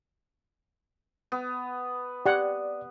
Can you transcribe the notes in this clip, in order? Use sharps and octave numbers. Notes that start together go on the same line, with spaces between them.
B3
G4 D5 F#5